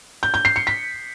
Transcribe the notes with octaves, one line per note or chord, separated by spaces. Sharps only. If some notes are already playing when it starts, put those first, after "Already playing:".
G6
G6
C7
C#7
B6